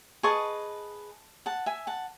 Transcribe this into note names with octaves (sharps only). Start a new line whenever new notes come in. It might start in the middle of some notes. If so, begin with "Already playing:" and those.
G#4 B4 D#5 A5 C#6
F#5 A5
E5 G#5
F#5 A5